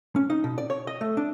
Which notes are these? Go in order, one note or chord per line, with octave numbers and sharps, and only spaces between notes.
C#4
D#4
B2
D5
C#5
D#5
A3
D4